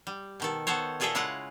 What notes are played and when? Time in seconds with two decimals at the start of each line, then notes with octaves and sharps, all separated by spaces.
0.07 G3
0.40 B2 D#3 A4
0.67 B3 A4 C5 C#5
1.00 A#2 F4 G#4 A4 D#5 E5
1.15 C#3 G#3 E4 F4 G#4 F#5